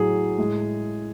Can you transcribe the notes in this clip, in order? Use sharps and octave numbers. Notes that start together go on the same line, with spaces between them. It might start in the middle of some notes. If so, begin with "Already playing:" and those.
Already playing: A2 F#3 G#4
A2 G#3